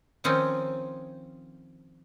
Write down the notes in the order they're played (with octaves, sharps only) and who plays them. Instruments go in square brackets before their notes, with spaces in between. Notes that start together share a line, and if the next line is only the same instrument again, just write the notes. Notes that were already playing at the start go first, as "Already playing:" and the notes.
[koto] D#3 F3 C4 C#4 D#4 F4